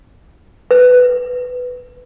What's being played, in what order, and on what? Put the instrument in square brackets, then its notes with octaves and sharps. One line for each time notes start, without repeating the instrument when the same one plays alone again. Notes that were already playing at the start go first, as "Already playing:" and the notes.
[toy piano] B4